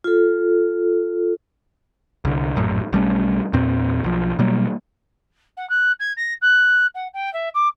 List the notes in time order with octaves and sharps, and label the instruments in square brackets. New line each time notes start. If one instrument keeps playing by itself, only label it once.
[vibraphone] F4 A4
[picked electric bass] C2 D3
A#1 F#2 A2
B1 G3 A3 C#4
E2 A#2 C4
B1 F3
B2 F#3 G3 A#3
[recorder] F#5
F#6
G#6
A#6
F#6
F#5
G5
E5
D6